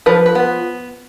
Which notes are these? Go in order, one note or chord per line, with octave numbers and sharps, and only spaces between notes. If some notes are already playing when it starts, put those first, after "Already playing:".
F3 B4
B4
B3